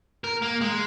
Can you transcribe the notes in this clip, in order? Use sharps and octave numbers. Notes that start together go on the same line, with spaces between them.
A#4
A#3
G#3